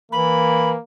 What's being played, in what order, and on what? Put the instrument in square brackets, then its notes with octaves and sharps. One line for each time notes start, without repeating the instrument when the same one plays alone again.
[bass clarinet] E3 [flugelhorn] A#3 [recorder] B5